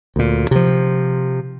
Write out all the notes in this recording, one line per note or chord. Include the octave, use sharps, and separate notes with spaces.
D2 A#2
C3 F3